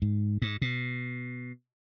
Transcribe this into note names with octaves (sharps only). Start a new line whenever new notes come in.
G#2
G#2
B2